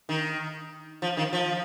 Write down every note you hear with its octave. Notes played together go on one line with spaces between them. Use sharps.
D#3
F3
D#3
F3